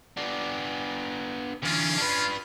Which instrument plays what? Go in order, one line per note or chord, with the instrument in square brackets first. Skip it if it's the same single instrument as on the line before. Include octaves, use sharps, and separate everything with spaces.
[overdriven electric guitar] B3 D4
[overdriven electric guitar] D3 E3 [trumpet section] C#4 F4
[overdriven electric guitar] D4 B4